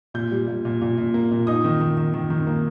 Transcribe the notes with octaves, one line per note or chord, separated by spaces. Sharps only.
A#2 G6
G3
A#2
A#2
A#2
A#2
A#3
A#2
D#4 D#6
D#3
D#3
D#3
D#3
D#3
A#3